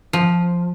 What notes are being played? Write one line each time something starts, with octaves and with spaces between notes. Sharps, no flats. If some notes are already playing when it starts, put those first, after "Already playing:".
F3